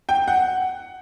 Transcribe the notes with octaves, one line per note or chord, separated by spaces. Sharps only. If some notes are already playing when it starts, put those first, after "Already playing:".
G5
F#5